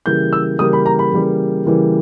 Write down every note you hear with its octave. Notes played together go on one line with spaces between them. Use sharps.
C#3 E3 G3 A#3 G6
E6
C#3 E3 G3 A#3 D#6
B5
A#5
B5
C#3 E3 G3 A#3
C#3 E3 G3 A#3